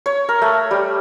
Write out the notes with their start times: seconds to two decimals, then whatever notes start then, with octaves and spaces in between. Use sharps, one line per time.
0.06 C#5
0.29 A#4
0.42 A3
0.71 G3